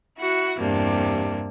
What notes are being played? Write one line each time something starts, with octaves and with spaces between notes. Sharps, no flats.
E4 F#4 F#5
E2 G2 C3 A#3 D4